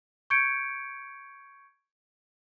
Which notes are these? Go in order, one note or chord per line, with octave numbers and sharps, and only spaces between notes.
C#6 G6 G#6 C#7 D7